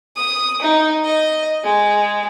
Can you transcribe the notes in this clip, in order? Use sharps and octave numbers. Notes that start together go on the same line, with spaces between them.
D#6
D#4
D#5
G#3